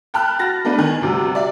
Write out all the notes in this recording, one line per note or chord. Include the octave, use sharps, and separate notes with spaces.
G5 A5 B5 F6 F#6
F#4 A6 A#6
A3 B3 D4 B4
D#3 G#5
D2 C3 G3
D5 E5